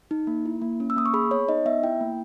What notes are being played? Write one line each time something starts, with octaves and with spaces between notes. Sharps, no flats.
D#4
A#3
E4
A#3
C#4
E6
A#3 D#6
C#6
G#4 B5
B3 C#5
D#4 D#5
B3 E5
E4 G5
A#3